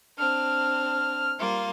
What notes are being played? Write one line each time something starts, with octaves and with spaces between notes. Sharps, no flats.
C4 D4 F6
G3 A#3 F4